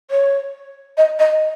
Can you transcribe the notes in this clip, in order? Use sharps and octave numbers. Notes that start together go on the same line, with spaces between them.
C#5
D#5
D#5